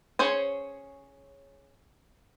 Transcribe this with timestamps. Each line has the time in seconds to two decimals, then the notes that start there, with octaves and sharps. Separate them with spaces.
0.19 C#4 G#4 C5 C#5